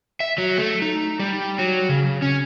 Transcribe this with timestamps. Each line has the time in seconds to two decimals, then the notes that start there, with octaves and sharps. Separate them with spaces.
0.20 E5
0.38 F#3
0.58 A3
0.82 D#4
1.19 G3
1.58 F#3
1.89 C#3
2.22 C#4